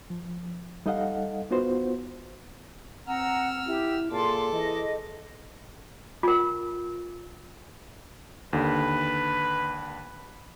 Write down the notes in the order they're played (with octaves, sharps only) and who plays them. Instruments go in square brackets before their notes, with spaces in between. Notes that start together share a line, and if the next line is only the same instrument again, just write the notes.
[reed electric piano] F3
G3 D#4 A4 D#5 F5 F#5
B3 D#4 F4 F#4 B4 C5
[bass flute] C4 [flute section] F#5 A#5 [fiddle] E6 F6
[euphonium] E4 [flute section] G4
[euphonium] A#2 [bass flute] G#4 [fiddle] A4 D6 [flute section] A5 C6
[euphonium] E3 [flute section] D#5
[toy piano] F4 A#4
[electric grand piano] D#2 D3 [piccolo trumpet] B4